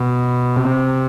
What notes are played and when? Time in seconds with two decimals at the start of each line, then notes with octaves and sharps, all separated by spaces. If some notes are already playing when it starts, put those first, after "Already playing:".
Already playing: B2
0.56 C3